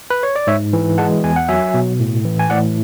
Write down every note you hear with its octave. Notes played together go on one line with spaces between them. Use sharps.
B4
C#5
D5
G#2 C#5 E5
E3
G#3 F#5 A5
E2 G#5
F#5
F#3 E5 G#5
B2
A2
E3
G#5
A2 D5 F#5